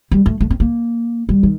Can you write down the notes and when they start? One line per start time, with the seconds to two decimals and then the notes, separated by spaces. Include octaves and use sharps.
0.11 G3
0.26 A3
0.41 A3
0.51 C4
0.60 A#3
1.29 G3
1.43 D#3